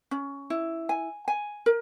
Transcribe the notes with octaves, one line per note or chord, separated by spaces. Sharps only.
C#4
E4
G#5
G#5
A#4